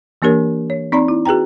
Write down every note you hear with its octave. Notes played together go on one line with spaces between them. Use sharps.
E3 A#3 D4 G4 A#4 C#5
C#5
C4 D#4 D5 A#5 B5
E4
F#4 G#4 B4 G5 A#5